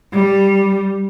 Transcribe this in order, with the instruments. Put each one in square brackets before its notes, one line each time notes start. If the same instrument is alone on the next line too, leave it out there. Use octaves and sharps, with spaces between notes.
[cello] G3